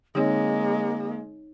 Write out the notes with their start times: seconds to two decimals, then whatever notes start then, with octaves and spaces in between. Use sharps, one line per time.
0.15 D3 G#3 A#3 C4 D#4 C#5